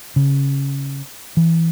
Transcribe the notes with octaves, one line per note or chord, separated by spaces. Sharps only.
C#3
E3